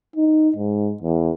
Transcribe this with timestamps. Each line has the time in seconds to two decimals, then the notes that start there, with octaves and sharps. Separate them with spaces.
0.16 D#4
0.57 G#2
1.02 E2